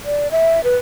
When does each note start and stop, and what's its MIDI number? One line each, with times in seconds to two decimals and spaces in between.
0.05 0.31 74
0.31 0.63 76
0.64 0.77 71